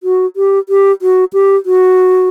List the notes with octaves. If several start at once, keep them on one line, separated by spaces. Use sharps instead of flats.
F#4
G4
G4
F#4
G4
F#4